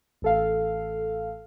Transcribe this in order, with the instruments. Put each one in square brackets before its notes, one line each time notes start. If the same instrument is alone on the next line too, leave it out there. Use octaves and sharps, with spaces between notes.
[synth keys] A1 A4 F5